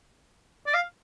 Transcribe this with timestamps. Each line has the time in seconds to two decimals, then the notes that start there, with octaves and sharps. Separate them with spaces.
0.67 D5
0.74 F5